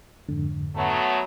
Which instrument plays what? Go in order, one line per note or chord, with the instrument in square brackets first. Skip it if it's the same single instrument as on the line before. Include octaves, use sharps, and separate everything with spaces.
[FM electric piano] F2 G#2 D3
[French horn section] F#3 A3 B3